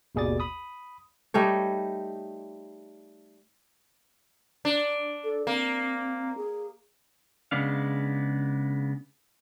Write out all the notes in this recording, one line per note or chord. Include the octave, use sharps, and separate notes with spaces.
G#1 D#2 B2 G#4 D5 A6
B5 D#6
G3 A3 D#4 C#5
D4
A4
A#3 C4
G#4
C#3 G#3 B3 D4 F5